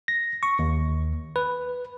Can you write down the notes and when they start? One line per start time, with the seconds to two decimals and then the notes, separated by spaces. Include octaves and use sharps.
0.08 A#6
0.43 C#6
0.59 D#2
1.36 B4